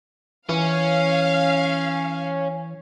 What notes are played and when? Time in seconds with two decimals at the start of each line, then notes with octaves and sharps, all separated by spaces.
0.49 E3 C#4 F5